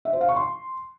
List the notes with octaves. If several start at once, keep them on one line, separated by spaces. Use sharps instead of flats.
E5
C5
F5
C#6
C6